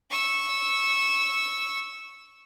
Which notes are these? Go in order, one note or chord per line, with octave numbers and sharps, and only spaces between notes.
C#6 E6